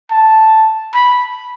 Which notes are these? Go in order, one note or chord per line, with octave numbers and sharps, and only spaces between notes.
A5
B5